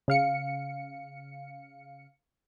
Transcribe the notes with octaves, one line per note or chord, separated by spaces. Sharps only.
C#3 F5 C#7